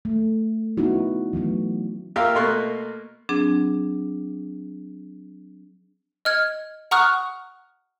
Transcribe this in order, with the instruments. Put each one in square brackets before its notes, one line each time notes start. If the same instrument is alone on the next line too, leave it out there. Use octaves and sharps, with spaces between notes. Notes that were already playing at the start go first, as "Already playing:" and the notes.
[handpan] A3
B3 C#4 D#4 E4 F#4
E3 F#3 A3 B3
[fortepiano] A#3 F4 G4 A#4 E5 F5
B2 A3 A#3 C6 C#6 F#6
[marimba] F#3 C4 D4 G#4
[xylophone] D#5 F6 G#6
F#5 A#5 C#6 D#6 F6 F#6